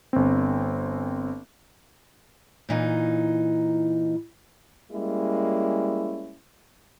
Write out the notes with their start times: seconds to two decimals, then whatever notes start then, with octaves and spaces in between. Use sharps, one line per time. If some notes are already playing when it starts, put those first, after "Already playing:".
0.13 G1 C4
2.69 A#2 E3 D#4
4.91 G3 G#3 A#3 C#4 E4